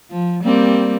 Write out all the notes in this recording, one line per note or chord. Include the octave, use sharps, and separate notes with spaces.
F3
G3 A#3 C4